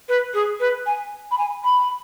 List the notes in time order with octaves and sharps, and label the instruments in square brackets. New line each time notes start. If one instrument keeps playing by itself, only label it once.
[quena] B4
G#4
B4
G#5
B5
G#5
B5